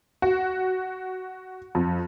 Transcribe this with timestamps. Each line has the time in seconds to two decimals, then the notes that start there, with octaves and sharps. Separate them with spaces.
0.22 F#4
1.75 F2